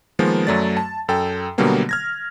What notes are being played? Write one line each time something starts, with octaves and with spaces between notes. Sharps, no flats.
D#3 F3 G#3 A#3 B3
F#2 F#3 A3 D5 A6
A5
F#2 A4 G5
B2 D3 F#3 G3 A#3 B3
F6 G#6 A#6